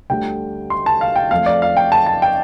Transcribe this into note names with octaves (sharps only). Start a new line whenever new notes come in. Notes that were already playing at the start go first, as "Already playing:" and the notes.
D2 D3 G3 G5
C6
A5
F5
G5
F2 F3 A3 F5
D5
F5
G5
A5
A5
G5